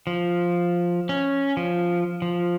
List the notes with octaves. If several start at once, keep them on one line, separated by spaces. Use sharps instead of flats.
F3
C#4
F3
F3